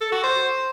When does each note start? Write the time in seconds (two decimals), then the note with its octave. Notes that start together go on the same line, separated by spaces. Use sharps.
0.01 A4
0.12 F#4
0.23 C5